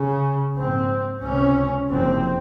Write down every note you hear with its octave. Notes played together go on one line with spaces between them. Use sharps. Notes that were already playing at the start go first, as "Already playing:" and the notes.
Already playing: C#3
A#1 G#2 C4
C#2 C3 C#4
F#1 F2 C3 C4